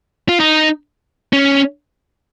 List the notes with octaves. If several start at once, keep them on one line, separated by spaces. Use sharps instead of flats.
F4
D#4
C#4